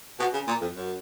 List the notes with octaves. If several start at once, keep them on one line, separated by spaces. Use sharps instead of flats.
B2
C#3
A#2
F2
F#2